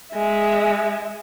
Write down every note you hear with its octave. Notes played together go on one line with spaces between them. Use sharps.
G#3 E5